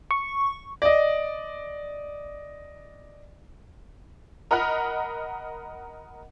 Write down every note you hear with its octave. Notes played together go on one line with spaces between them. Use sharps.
C#6
D5 D#5
A#4 D#5 F#5 B5 F6